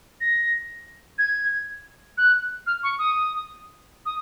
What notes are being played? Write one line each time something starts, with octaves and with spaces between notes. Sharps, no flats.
A#6
G#6
F#6
F6
C#6
D#6
D#6